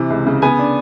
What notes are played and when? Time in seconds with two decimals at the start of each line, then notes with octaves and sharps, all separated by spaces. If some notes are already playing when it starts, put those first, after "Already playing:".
Already playing: C3 E3
0.10 C#2
0.26 C#3
0.42 B3 G#5
0.59 D4